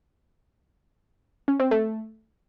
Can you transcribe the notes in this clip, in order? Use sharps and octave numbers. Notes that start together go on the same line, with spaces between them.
C#4
C4
A3